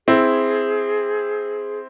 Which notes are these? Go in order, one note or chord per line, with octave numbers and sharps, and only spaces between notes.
C4 E4 G#4